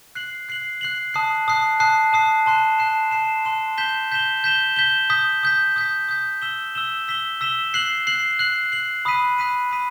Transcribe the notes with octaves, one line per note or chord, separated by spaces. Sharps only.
F#6 C7 F#7
F#6 C7 F#7
F#6 C7 F#7
A5 D#6 F#6 C7
A5 D#6 F#6 C7
A5 D#6 F#6 C7
A5 D#6 F#6 C7
A5 C6 F#6 C7 E7
A5 C6 F#6 C7 E7
A5 C6 F#6 C7 E7
A5 C6 F#6 C7 E7
G6 B6 E7 G7
G6 B6 E7 G7
G6 B6 E7 G7
G6 B6 E7 G7
D#6 G6 B6
D#6 G6 B6
D#6 G6 B6
D#6 G6 B6
E6 B6 E7 G7
E6 B6 E7 G7
E6 B6 E7 G7
E6 B6 E7 G7
F#6 C7 F#7
F#6 C7 F#7
F#6 C7 F#7
F#6 C7 F#7
B5 D#6 F#6 B6 D#7
B5 D#6 F#6 B6 D#7
B5 D#6 F#6 B6 D#7